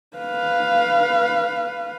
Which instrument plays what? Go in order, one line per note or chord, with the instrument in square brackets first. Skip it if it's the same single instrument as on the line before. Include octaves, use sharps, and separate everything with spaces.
[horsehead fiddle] B4 F5